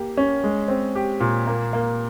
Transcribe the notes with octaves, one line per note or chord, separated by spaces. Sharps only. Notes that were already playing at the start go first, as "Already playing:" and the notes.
Already playing: A#3 G4
C#4
G#3
C4
G4
A#2
A#3
A#3